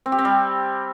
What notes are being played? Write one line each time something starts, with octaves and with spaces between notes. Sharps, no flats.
C4
G4
C4
G3